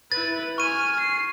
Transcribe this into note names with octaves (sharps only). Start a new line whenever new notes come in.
E4 B4 A6
G#5 C#6 F6 D#7
C7